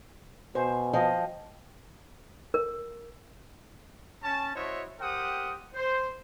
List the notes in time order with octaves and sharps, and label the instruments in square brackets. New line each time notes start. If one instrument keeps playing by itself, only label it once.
[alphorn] B2 [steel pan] C5 [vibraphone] G#5
[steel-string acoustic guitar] F3 [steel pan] D#5 [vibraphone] G5
[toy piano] A#4
[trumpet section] C#4 A5
E4 F#4 C5 C#5 D#5 E5
G4 A#4 C5 F#5 G5 D#6
C5